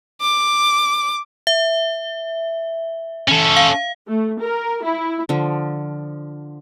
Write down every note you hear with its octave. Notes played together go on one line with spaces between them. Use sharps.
D6
E5
C#4 A4
F5
A3
A#4
E4
D3 F3